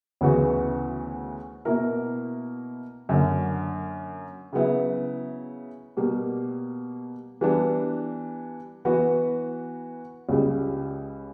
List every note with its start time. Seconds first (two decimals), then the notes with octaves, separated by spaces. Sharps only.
0.21 D2 C#3 E3 B3 F#4
1.65 B2 A#3 E4 A#4
3.09 F#2 D3 A#3
4.53 C#3 F#3 B3 E4
5.97 B2 G3 A#3
7.41 E3 G3 B3 D4
8.85 E3 B3 F#4 B4
10.29 C#2 C#3 G3